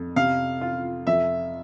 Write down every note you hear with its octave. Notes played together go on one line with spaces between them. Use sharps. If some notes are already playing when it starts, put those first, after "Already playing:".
Already playing: F2
C3 F5
F4
F2 E5